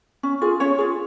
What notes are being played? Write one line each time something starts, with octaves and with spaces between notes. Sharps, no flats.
C#4
F4 G#4
C#4 C#5
F4 G#4